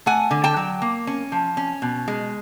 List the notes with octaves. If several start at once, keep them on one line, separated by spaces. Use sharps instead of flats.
A3 F#5 G#5
D3
G5 A5
F#3
A#3
C#4
F3
C#4
B2
G#3